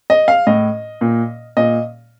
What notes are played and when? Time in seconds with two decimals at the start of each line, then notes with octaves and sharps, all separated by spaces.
0.10 D#5
0.28 F5
0.47 A2 D#5
1.01 A#2
1.57 A#2 D#5